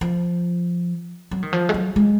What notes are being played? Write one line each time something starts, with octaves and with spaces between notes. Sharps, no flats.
F3
F#3
D#3
F3
G#3
F#3
G#3